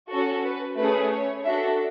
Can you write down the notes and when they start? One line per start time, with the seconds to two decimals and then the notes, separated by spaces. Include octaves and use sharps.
0.11 C#4 F#4 A4
0.44 B4
0.78 A3 C#4 G#4 B4
1.11 C#5
1.44 D4 F#4 A4 E5